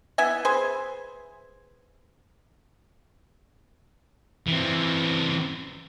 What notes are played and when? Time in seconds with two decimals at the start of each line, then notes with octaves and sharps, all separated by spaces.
0.18 B3 E4 E5 G#5
0.45 G#4 B4 C5 G#5
4.48 E3 C4